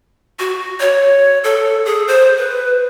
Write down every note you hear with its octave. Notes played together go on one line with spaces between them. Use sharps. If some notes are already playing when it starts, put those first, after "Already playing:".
F#4
C#5
A4
G#4
C5
B4